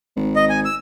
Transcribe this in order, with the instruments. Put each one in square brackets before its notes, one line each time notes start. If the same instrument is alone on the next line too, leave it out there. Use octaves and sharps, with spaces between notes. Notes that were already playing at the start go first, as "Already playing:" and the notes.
[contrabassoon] G#1
[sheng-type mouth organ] D#5
G#5
E6